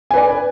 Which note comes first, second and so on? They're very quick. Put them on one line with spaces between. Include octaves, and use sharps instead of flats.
G#5 B4 D5